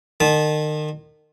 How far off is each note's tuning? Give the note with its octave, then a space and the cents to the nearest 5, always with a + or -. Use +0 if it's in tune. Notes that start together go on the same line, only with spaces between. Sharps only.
D#3 -35 A5 -20